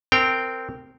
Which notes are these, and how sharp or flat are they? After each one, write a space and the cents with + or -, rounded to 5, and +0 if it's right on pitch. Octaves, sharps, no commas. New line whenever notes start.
C4 -10 A#4 -20 G5 +0